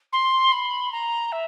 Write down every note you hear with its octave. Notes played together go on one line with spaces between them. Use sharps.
C6
B5
A#5
E5